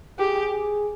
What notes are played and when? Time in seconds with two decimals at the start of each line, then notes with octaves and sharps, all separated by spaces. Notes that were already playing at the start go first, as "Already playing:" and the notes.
0.19 G4 G#4
0.53 G#4